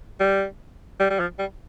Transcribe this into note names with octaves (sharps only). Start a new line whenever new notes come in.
G3
G3
G3
F3
G3